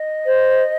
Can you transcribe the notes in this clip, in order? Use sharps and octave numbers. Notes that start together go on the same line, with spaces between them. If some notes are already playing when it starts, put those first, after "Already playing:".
Already playing: D#5
C5